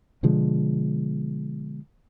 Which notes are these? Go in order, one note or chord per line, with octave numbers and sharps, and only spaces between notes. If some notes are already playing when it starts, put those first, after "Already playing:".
B2 D3 F3 G#3